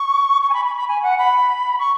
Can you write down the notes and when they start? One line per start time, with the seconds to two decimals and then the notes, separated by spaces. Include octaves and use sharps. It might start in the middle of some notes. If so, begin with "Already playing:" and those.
Already playing: C#6
0.42 C#6
0.50 G#5
0.54 B5
0.65 B5
0.76 B5
0.88 G#5
1.03 F#5
1.18 B5
1.79 C#6